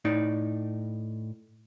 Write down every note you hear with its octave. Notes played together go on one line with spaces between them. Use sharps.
A2 D#4 D5